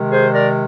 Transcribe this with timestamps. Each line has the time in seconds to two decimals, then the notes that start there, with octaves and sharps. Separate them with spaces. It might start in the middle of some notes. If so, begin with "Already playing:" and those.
Already playing: C3 D#3 G#3
0.11 G#4 C5
0.33 A#4 D5